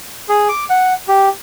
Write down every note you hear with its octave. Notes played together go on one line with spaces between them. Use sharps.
G#4
D6
F#5
G4